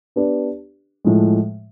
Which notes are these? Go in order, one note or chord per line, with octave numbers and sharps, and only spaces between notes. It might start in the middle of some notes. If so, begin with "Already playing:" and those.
B3 D4 G4 B4 D5
A2 F3 G#3